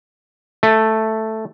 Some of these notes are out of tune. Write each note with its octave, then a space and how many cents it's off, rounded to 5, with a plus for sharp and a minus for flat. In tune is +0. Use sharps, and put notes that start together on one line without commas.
A3 +0